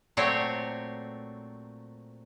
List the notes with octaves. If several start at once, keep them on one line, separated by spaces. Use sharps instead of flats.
A#2 F#3 A3 C4 C#5 G5